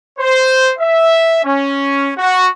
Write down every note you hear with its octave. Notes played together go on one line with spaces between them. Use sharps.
C5
E5
C#4
F#4